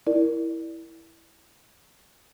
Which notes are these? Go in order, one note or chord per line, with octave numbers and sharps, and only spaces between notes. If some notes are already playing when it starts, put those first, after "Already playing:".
E4 A#4 D5